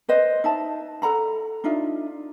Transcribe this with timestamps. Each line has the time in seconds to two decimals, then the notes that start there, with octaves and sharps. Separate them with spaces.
0.09 B4 C5 D#5
0.44 D#4 E5 A5
1.02 A4 F#5 A#5 B5
1.64 D4 D#4 F4 E5